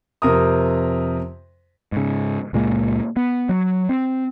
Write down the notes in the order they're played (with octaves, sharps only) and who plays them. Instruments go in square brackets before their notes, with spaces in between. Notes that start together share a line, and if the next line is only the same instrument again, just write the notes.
[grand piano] F2 C3 A#4 D#6
[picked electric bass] G#2 C#3
C#2 A#2 G#3 A#3
B3
F#3
C4